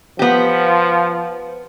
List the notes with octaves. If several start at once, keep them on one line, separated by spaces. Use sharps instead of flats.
F3 B3 G4